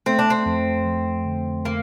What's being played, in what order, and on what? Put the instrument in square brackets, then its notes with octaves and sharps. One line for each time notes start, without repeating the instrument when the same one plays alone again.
[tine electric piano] A3 [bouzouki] C4
[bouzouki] D4
C4
[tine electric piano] F2
F3
D3
[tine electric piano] A3 [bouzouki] A#3